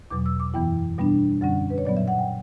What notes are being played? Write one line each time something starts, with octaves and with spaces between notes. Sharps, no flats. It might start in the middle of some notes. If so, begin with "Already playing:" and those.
E2 B2 F#3 D6
E6
D6
F#2 E3 B3 E4 G5
B2 G3 B3 D4
F#2 D3 G3 C#4 F#5
B4
C#5
A#2 F#3 B3 D5
E5
F#5
G5